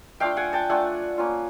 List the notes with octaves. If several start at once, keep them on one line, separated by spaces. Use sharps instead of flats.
A3 D4 F4 F5 G5
F#5 G#5
G5 A5
A3 D4 F4 F#5 G#5
A#3 C#4 F4